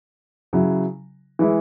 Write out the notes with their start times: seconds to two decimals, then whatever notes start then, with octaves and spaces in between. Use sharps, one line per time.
0.53 C#3 F#3 E4
1.39 E3 G#3 E4